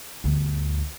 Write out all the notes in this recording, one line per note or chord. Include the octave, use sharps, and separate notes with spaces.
G1 D2